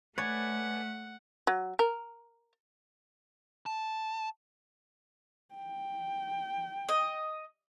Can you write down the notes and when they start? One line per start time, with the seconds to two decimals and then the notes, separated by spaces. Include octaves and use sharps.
0.18 A3 B4 C#5 D5 F#5 G#5
1.47 F#3
1.79 A#4
3.66 A5
5.55 G5
6.89 D#5